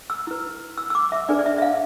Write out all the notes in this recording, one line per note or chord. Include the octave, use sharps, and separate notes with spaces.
E6
E4 B4
E6
E6
D6
E5
D4 G#4 B4 D5
D5
E5
E5
F5